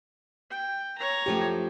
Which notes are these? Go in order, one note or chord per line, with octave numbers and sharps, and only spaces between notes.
G5
C#5 A#5
F#2 F3 A3 G4